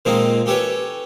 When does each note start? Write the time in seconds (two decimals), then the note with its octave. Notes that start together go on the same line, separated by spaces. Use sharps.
0.05 A#2 D#3 F3 G#3 C4 D#4
0.46 C#4 G4 A4 B4 C#5